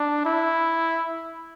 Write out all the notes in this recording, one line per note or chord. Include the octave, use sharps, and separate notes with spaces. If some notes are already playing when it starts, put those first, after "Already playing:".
Already playing: D4
E4